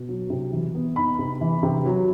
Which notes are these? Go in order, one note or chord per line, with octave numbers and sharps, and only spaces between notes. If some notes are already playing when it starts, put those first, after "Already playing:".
Already playing: B2
F#3
C3
E3
B3
D#4 B5
C3
E3
C3
F#3